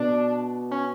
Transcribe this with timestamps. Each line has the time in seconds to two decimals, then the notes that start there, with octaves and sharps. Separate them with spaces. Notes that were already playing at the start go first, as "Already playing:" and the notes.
Already playing: B2 D4
0.71 C#4